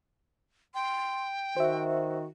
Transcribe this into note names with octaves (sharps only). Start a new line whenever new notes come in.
G5 C6
D#3 F#4 C5 E5